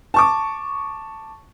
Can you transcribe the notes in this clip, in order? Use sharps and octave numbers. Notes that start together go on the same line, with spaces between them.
A5 C#6 D6